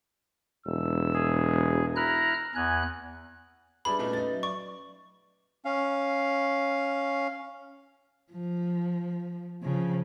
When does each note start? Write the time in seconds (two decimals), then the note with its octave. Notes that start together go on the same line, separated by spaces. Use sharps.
0.66 E1 E6
1.14 G#4
1.96 E4 A#5 F6 F#6
2.55 E2 G#5 F#6
3.85 G3 D4 G#4 B4 E5 B5
3.99 A#2 A3 C#4 D#4 F#4 B4
4.13 D#4 A6
4.31 F#3 E5
4.43 D5 C#6
5.65 C#4 F5
8.32 F3
9.63 C#3 F3